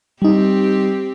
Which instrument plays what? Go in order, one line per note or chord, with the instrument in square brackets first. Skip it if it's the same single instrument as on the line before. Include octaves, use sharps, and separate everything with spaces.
[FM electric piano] G3 D#4 [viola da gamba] C4 G4